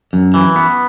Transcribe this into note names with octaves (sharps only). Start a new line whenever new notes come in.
F#2
E3
B3